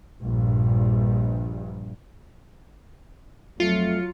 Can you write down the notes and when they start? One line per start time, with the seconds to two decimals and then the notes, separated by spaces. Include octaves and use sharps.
0.21 A#1 G2
3.60 F2 F#3 A3 F4 C#7